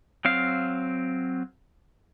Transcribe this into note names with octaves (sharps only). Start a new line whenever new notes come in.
F#3 C4 F5